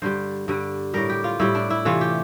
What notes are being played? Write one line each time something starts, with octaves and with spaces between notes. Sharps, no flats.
G2 D3 G3 C5
G2 D3 G3
A2 G3 A#4
G4
F4
A2 G3 E4
D4
E4
C3 E3 A3 F4
G4